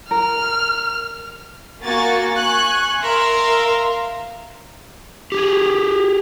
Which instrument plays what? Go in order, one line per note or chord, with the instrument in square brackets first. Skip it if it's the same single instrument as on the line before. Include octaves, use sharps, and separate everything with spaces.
[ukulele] A#4 [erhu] F6
[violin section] A#3 F#4 G#5 C#6 A6
G#5 C#6 F#6
A#4 E5 F5 C6
[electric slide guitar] G4 G#4